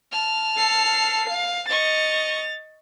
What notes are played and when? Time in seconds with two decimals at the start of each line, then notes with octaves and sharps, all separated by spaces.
0.11 A5 F6
0.57 A4 C7
1.30 F5
1.69 D#5 C#6 A6 F7